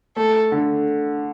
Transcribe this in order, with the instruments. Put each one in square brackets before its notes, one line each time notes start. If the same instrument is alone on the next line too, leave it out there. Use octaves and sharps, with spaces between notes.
[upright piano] A3 [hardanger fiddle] A4
[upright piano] D3